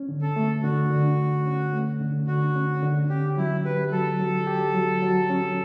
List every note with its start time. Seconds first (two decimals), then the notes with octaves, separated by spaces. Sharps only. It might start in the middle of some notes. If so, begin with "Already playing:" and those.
Already playing: C#4
0.09 D3
0.22 A4
0.36 A3
0.63 D3 F#4
0.91 D3
1.19 D3
1.46 C#4
1.73 A3
2.01 D3
2.27 D3 F#4
2.56 C#4
2.82 D3
3.09 C#4 G4
3.37 F#3 E4
3.65 G4 B4
3.92 F#3 A4
4.20 F#3
4.47 G4
4.75 F#3
5.02 F#3
5.30 C#4